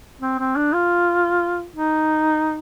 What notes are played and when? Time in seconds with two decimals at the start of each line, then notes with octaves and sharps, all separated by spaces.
0.21 C4
0.39 C4
0.56 D4
0.73 F4
1.76 D#4